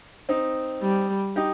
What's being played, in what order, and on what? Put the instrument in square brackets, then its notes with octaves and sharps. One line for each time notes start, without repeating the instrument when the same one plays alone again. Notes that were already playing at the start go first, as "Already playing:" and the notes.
[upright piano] C4 D#4
[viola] G3
[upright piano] D#4 G4